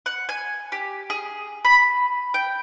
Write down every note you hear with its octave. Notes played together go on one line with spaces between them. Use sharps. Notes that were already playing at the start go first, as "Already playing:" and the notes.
F#5
G#5
G4
G#4
B5
G5